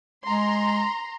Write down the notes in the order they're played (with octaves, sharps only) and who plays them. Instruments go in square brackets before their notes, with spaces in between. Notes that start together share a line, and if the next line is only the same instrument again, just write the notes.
[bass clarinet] G#3 [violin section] A#5 C6